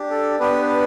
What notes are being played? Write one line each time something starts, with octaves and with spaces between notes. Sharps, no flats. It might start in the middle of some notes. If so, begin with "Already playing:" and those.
Already playing: D4 G4
A4
B3 D4 G4 B4
B4